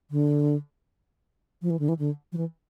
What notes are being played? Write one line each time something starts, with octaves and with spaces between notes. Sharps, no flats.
D3
F3
E3
D3
E3
D3
F3
E3